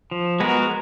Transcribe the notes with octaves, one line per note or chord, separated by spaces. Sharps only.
F3
G#3 B3 F#4 A#4